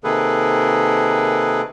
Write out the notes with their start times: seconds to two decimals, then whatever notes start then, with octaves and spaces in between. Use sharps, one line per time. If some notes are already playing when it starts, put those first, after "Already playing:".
0.04 C3 D#3 A#3 G#4 A4 B4